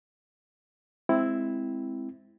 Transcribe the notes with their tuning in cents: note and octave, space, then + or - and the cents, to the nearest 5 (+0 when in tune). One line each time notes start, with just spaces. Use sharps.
G#3 +0 C4 -5 E4 +0